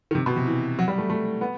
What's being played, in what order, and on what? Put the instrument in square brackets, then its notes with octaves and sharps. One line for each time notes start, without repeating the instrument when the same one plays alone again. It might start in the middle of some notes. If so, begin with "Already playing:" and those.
[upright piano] D#3
C3
B2
C3
E3
F#3
G3
A3
A3
B3